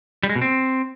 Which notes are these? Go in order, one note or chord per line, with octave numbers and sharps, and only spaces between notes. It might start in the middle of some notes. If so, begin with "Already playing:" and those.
G3
G#3
B2
C4